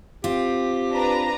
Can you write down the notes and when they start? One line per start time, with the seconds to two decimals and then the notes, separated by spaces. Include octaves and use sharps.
0.24 C4 F4 G4
0.92 D4 B4 A#5